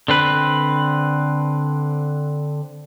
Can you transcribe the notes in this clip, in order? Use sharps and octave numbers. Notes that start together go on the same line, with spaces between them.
D3 C4 B4